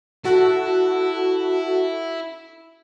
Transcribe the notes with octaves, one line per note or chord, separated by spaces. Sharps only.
E4 F#4 A4